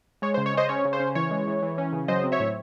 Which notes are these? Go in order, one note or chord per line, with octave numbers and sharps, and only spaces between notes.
G#3 C#5
C5
C#3
C#5
C#4 C5 D#5
C#4 C#5
C#3
C5
C#4
E3 C#5
G#3
E3
E3
C#4
C#3
F#3 C5 D#5
C4
C#5 E5
A2